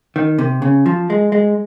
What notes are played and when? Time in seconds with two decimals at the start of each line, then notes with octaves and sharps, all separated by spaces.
0.16 D#3
0.39 C3
0.62 C#3
0.86 F3
1.10 G#3
1.32 G#3